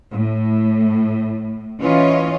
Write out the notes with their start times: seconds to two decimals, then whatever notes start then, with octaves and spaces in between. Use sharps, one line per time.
0.13 A2
1.81 E3 C#4 F4 C#5 D#5